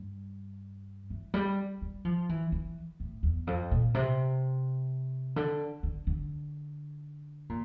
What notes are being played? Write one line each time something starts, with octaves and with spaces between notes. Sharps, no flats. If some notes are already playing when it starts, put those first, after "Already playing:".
Already playing: G2
E3
G3
G3
F3
E3
E3
A2
E2
F2
A#2
C3
D3
D3
D3
A#2